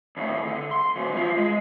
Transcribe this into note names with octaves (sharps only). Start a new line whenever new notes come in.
D#2 A2
D3
C6
D2 F#3
E3 F4
G#3